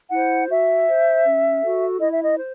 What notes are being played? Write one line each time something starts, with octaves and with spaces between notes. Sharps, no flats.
E4 C5 F#5
F#4 E5
C5
C#4
F#4 A4
E4 D#5
E5
D#5
C5